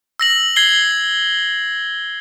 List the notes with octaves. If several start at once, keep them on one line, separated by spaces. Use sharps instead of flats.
E6 A#6 F#7
G#6 C7 G7